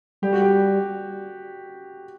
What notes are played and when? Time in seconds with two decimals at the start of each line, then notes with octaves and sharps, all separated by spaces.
0.22 G3 G4
0.33 F#4
0.42 G4